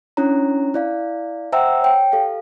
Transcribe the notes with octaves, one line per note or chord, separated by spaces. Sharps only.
C#4 D4 E4 C#5 A#5
E4 D5 F5
C5 E5 F#5 G5 A#5 E6
C#5 G5
G4 A4 F5